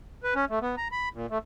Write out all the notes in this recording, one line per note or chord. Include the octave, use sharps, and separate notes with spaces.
B4
C#4
A3
B3
A#5
B5
A#2
A3